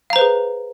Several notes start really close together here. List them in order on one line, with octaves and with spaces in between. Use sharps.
F5 A#5 C5 B4 G#4